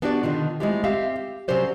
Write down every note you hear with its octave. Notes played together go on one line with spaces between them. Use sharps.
B3 D4 E4 F#4 G4 D5
B2 D3 D#3 F4
G#3 A3 C4 E4 F4 G4
C4 G4 E5 F5
G4
C3 F#3 C#4 G4 C5 D5